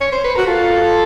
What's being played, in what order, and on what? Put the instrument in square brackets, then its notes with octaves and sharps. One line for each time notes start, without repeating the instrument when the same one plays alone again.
[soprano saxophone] C#5
C5
B4
[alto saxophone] F#4 [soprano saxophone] A#4
[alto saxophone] F4 [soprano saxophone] A4